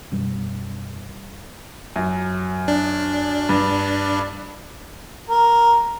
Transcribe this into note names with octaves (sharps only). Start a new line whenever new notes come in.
F#2 B2 G3
F#2
D4
G2
A#4